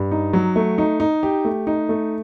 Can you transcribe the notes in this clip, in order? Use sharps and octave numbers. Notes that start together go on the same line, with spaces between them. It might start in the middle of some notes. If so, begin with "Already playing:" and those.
Already playing: G2
D#4
F#3
A3
D#4
D#4
G4
A3
D#4
A3